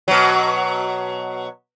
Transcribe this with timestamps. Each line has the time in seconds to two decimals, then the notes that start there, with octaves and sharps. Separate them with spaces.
0.08 B2 F#3